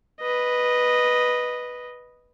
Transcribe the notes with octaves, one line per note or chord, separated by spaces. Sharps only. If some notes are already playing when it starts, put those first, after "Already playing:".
B4 D#5